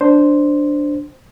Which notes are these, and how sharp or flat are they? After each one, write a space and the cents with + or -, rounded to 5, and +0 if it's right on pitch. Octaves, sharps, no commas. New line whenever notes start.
D4 +0 C5 +0